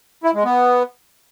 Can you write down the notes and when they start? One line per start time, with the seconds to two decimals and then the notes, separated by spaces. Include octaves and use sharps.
0.24 E4
0.34 G#3
0.44 B3